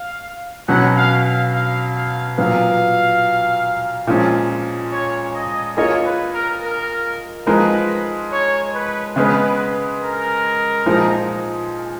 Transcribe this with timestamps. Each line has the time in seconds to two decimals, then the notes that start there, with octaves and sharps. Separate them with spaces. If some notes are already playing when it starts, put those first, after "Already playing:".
Already playing: F5
0.68 B2 F#3 C#4 F#5
0.96 F5
1.24 F5
1.53 F5
1.95 F5
2.38 A#2 F#3 B3 F5
4.07 A#2 F3 G#3 C#4
4.92 C#5
5.34 D#5
5.77 A#3 F4 G#4 C#5 D#5
6.05 B4
6.34 A#4
6.62 A#4
7.46 F3 G#3 D#4 A#4 B4
8.32 C#5
8.74 B4
9.16 C#3 G#3 B3 B4
10.02 A#4
10.86 A#2 F3 G#3 D#4